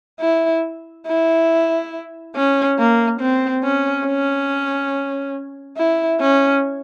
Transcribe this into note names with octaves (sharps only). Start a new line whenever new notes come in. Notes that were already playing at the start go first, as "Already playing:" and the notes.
E4
E4
C#4
A#3
C4
C#4
C#4
E4
C#4